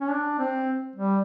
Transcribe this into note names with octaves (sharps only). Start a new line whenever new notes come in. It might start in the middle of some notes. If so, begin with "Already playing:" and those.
C#4
D4
C4
G3